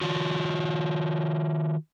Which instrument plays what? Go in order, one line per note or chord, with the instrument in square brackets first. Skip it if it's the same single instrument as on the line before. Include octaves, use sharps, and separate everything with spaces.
[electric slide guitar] D#3 F4 F#4